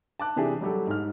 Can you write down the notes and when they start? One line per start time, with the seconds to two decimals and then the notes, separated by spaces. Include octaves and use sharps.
0.20 A5 D6 F#6
0.36 C3 E3 D4 G4 G#4
0.61 F#3 G3 G4 A4
0.87 G#2 F6